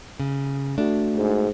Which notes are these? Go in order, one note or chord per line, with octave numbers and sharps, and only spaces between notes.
C#3
A3 D4 F#4
G#2